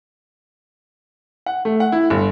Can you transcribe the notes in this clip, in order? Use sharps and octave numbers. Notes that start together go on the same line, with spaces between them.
F#5
A3
F#5
E4
G1